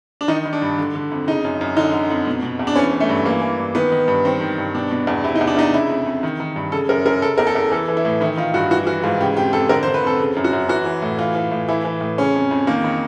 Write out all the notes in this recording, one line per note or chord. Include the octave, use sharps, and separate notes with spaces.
D4
D#3 D#4
D#3
D4
G2
D3
D3
F2
C#3 D#4
F#2
F#2
D3 D#4
D3
F2
B2
B2
E2
D4
E3 C#4
E3
A3
G2
E3 A#3
E3
G2
D#3 B3
D#3
G2
D#3 C4
D#3
G2
B2 D4
B2
E2
C3 E4
D#4
E2
D4
E2 D#4
C#3 E4
F2
F2
D#3
D#3
G2
C#3 A4
F#2 A#4
F#2 A#4
C#3 A4
E2 A#4
A4
E2
E3 A4
E3
E4
A2
D#3 E4
D#3 F4
G2 F#4
E3 F#4
E3 F#4
G#2 F4
C#3 G4
F2 G4
F2 A4
D3 A#4
C5
D3
B4
F2 A4
C#3
F#2
F#4
F#2
E3 F#4
E3
A2
E3 F4
E3
A2
E3 E4
E3
A2
C#3 C#4
F2
F2
D#3 A#3
D#3